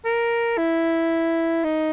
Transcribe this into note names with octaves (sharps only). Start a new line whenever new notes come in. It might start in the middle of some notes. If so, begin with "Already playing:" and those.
A#4
E4
D#4